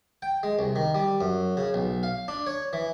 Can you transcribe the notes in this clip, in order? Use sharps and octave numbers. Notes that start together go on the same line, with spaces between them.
G5
G#3
C2
D#3
G3
F#2
C#3
B1
F5
D4
C#5
E3